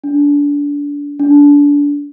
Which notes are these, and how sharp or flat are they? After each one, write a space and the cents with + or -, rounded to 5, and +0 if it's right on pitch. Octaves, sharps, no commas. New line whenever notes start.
D4 -25
D4 -25